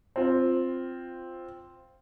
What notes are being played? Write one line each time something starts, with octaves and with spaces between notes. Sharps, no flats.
C4 F4